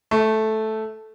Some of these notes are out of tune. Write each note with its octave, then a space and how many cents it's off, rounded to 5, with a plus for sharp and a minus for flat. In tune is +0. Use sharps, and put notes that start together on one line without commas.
A3 -10